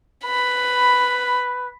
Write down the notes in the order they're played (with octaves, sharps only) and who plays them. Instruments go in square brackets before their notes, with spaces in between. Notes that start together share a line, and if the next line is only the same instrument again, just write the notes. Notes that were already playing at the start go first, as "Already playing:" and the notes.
[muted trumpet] B4 [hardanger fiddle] B5